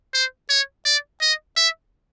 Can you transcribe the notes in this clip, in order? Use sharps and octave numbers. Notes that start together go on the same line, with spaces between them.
C5
C#5
D5
D#5
E5